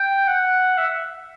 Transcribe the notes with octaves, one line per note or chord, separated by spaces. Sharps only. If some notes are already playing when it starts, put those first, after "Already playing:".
Already playing: G5
F#5
E5